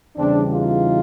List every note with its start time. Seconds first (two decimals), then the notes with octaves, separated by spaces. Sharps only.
0.16 E2 C#3 E3 G3 C4 D4
0.51 D#4 F4